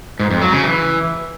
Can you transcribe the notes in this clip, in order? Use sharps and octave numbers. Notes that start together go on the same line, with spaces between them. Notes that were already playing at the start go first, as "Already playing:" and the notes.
G#2
F2
F#3
C#3
E3